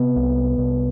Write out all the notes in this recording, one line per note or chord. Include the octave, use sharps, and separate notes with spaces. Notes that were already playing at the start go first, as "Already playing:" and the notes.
Already playing: C3 B3
C2
C2